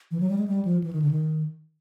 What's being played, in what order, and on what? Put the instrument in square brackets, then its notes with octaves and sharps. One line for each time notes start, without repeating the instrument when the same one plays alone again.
[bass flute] E3
F#3
G3
G#3
G3
F3
E3
D#3
D3
D#3